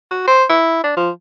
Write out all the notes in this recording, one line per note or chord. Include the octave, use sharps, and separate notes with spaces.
F#4
C5
E4
D4
F3